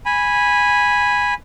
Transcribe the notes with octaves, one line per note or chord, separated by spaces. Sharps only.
G#5 B5